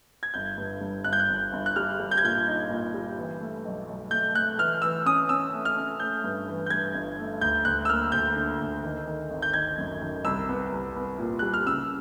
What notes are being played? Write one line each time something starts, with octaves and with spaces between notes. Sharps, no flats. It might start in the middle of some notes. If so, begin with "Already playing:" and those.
G#6
G1 G6
G2
G2
G1 F#6
G6
F#6
G1
G1
F#6
G3 F6
G3
G6
G#6
A#2 G6
D#4
A#2
G3
E3
A3
B1
B1
A3 G6
A3 F#6
E3 F6
E3 E6
C#4 D#6
C#4 E6
A3
F6
C#4
A3 G6
G2
E3
G6
G2 G#6
G1
A3
D2 G6
D2 F#6
E6
A#3 F6
D2 G6
D3
D2
D#3
D#3
G#1
G6
D#3 G#6
F#2
D#3
C2 E6
B3
C2
B3
A#2
G3 F#6
F6
C#3 E6